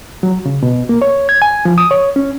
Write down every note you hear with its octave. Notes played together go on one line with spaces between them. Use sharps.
F#3
C#3
B2
A#3
C#5
G#6
G#5
F3
D#6
C#5
C#4